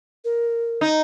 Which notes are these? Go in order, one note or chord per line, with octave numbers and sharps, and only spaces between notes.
A#4
D#4